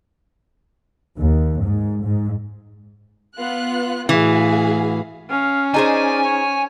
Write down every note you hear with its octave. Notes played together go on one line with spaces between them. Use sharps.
D#2
G#2
G#2
B3 F4 F#6
A2 E3 F#4 G#4 F5
C#4 F5
D#4 G#4 C5 D5 G#5
C#5